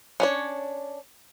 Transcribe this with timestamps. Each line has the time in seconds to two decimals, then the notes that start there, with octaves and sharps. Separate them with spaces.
0.20 C#4 D4 C#5